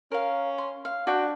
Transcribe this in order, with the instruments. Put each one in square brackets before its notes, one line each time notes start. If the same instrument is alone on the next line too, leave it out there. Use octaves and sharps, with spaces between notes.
[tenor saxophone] C#4 [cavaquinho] A#4 F5
[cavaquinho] C6
F5
[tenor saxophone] D4 [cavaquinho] F#4 G5